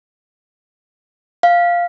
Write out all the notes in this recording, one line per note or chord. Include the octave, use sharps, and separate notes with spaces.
F5